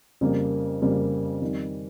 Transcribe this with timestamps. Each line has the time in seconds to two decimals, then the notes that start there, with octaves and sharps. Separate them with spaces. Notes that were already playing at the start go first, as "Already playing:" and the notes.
0.21 F2 C#3 G3 A#3
0.82 F2 C#3 G3 A#3
1.42 F2 D#3 G3